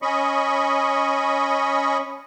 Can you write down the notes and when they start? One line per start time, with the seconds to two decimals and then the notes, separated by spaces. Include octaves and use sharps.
0.02 C#4 D#5 B5 C#6